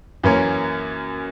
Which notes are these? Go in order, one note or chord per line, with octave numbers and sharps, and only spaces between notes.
F#2 E3 A#3 C#4